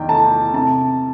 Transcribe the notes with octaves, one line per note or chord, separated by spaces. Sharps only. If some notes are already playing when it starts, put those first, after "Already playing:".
Already playing: E2 D#3 G5
A3 A5
C3 A5